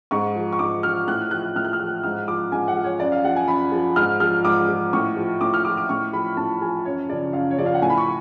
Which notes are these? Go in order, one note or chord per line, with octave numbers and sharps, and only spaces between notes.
G#2 C#6
F3
C#6
G#2 D6
F3 F6
A2 F#6
F3 F#6
A2 F6
F#6
F6
F3
G#2 F6
F3 D6
G#2 G#5
F#5
F3
C#5
F#2 D5
F5
F3 F#5
G#5
F#2 B5
F3
G#2 F6
F3 F6
G#2 D6
F3
A2 C#6
F3
A2 D6
F6
F3 D6
D6
A2 C#6
F3 B5
A2 A5
F3 G#5
F#2 C#5
C#3 F3 D5
F#2 F5
C#5
C#3 F3 D5
F5
F#5
A2 G#5
B5
C#6